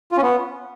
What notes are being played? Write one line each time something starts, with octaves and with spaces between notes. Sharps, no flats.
F4
C#4
B3